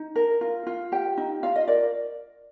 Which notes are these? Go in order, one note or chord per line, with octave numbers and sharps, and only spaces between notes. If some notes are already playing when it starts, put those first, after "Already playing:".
Already playing: D#4
A#4
F4
F4
G4 G5
D#4
F4 F5
D#5
A#4 D5